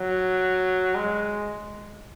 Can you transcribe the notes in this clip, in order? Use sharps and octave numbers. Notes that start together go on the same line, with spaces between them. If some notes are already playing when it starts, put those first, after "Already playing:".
Already playing: F#3
G#3